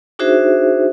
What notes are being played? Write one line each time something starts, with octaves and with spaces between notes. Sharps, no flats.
D4 D#4 F#4 G#4 C5 E5